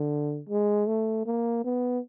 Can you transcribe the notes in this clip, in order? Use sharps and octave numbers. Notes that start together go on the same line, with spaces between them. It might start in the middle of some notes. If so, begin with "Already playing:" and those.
Already playing: D3
G#3
A3
A#3
B3